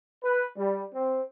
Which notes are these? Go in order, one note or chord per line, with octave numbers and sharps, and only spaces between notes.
B4
G3
C4